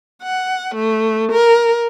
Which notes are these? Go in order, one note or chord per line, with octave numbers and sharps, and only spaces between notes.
F#5
A3
A#4